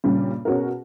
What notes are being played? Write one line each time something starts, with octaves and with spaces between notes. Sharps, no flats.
G2 A#2 C#3 G3 C#4
B2 C#4 F#4 G#4 A#4